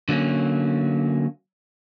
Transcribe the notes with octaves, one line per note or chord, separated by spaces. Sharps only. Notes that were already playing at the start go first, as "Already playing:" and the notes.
D3 F#3 A#3 C#4